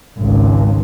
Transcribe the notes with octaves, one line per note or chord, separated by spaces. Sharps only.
G#1 C#2